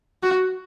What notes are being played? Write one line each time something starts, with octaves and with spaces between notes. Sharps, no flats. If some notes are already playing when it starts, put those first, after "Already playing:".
F#4